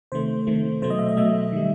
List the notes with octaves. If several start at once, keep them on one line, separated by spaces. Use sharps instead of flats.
C3 D#3 A3 C5
C3 D#3 A3
B2 F#3 A3 C5
D#5
E5
D#5
B2 F#3 A3 E5
D#3 G3